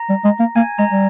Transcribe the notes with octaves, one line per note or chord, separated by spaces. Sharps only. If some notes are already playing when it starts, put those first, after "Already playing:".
Already playing: A#5 A#6
G3
G#3
A#3
A#3 G#5 G#6
G#3 A#5 A#6
G3